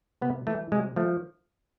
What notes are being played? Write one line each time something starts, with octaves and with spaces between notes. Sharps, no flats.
C3 B3
E3 A3
C3 G#3
F3 A3